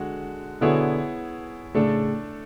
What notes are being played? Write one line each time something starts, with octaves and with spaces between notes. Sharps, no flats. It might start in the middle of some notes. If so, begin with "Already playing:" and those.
Already playing: D3 G#3 F#4
B2 D3 B3 E4 G#4 C#5
A2 C#3 A3 D4 A4